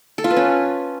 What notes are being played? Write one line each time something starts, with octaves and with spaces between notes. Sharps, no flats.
A4
F4
B4
C#4